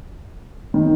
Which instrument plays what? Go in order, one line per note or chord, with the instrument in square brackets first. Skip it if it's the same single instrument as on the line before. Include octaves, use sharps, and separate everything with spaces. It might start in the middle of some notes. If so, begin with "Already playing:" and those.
[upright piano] D#3